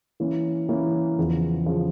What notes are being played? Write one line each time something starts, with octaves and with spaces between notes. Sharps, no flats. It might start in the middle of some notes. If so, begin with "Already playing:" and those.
E3 A#3 C#4
E3 A#3 C#4
E2 C#3 F3
C#3 F3